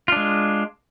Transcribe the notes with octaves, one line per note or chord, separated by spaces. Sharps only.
G#3 D4 F4